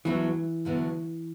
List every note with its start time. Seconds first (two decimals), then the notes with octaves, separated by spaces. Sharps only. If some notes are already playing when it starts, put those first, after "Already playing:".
0.05 D2 D3 E3 F#3 B3
0.65 D2 D3 F#3 B3